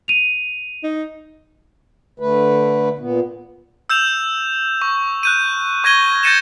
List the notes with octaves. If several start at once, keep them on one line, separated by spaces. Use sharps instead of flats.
D#7 F7
D#4
D3 A3 B4
A#2 B3
E6 G6 E7 F7
C#6
F#6 G6 D#7
C#6 G#6 A#6 D#7 G7
G6 A6 A#6 C#7 D#7 E7